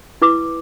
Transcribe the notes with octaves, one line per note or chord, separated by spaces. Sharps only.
E4 B4 D6